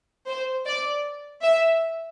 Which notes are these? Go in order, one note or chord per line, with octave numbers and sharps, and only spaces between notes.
C5
D5
E5